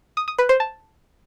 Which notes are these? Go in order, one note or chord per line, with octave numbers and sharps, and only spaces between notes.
D#6
D#6
B4
C5
A5